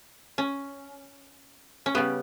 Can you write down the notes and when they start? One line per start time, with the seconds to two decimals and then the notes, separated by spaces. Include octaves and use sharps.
0.38 C#4
1.86 C#4
1.95 C#3 G3 B3